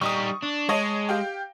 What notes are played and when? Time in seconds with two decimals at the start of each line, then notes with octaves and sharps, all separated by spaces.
0.01 G3 D#4 C#6 D#6
0.43 D4
0.69 G#3 C#5 D#5 A5
1.09 G4 F5 G5